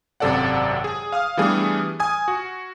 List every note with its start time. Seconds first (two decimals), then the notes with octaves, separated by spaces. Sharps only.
0.20 G#1 F#2 C3 A4 D5 F#5
0.84 G#4
1.12 F5 D#6 F6
1.37 E3 G3 A3 B3 D4 G#4
2.00 G#5 D#6 G#6
2.28 F#4